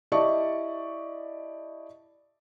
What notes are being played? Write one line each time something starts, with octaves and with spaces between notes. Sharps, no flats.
E4 G4 D5 D#5 A5 C#6